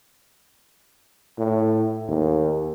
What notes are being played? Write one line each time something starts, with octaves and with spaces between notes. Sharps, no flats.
A2
D#2